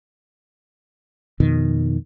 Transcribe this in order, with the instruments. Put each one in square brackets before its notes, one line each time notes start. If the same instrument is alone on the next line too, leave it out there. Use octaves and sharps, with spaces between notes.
[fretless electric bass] F2 B2 D#3